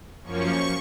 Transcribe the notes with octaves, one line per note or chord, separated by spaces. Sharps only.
F#2 F3 A#3 C#4 C#6